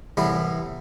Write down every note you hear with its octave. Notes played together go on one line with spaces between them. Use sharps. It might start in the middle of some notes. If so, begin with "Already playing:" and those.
C2 A2 E3 B3 E4